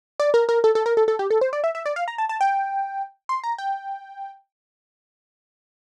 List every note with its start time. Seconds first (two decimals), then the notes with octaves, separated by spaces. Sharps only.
0.20 D5
0.34 A#4
0.49 A#4
0.64 A4
0.75 A4
0.86 A#4
0.97 A4
1.08 A4
1.19 G4
1.30 A4
1.41 C5
1.53 D5
1.64 E5
1.75 E5
1.86 D5
1.96 F5
2.08 A#5
2.18 A5
2.29 A5
2.41 G5
3.29 C6
3.44 A#5
3.58 G5